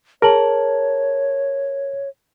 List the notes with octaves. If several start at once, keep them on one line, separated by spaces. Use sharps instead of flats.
G#4 A#4 C#5 A5 F#7